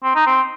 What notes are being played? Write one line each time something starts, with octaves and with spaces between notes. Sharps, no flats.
C4
D#4
C4